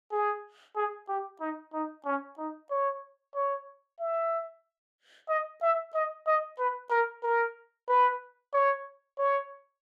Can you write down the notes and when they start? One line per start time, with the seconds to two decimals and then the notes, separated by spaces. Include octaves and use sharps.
0.11 G#4
0.76 G#4
1.08 G4
1.40 D#4
1.73 D#4
2.05 C#4
2.38 D#4
2.70 C#5
3.35 C#5
4.00 E5
5.29 D#5
5.62 E5
5.94 D#5
6.27 D#5
6.58 B4
6.90 A#4
7.23 A#4
7.88 B4
8.53 C#5
9.18 C#5